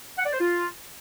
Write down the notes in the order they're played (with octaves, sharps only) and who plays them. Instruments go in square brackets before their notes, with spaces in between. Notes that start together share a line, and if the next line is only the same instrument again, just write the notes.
[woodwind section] F#5
D5
C5
F4